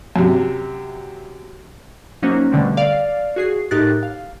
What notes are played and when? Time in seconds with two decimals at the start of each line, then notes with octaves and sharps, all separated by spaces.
0.16 F#2 C3
2.22 F#3 A#3 C#4 D#4 F#4 C5
2.52 B2 D3 G3 A3 C4
2.77 D5 F5
3.36 F#4 G#4 C7
3.71 A2 D#4 G4 A#4 F#6 A6
4.03 F5